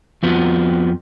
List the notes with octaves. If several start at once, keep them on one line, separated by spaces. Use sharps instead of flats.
F2 F3 B3 F#4